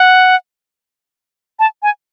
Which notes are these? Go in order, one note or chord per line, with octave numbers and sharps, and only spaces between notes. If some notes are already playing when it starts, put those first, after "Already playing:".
Already playing: F#5
A5
G#5